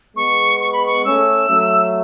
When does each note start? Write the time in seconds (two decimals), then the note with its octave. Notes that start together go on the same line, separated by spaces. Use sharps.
0.16 G#3 B3 C#6
0.61 C#6
0.73 B5
0.86 C#6
1.05 A3 C#4 E6
1.49 F#3 A3